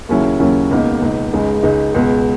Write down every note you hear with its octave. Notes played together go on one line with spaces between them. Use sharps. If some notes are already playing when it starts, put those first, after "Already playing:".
D#2 C#3 F#3 C#4 E4
D#2 C#3 F#3 C#4 E4
C#2 B2 A#3 D#4
C#2 B2 A#3 D#4
C#2 C#3 G#3 D#4
C#2 C#3 G#3 D#4
C#2 B2 G#3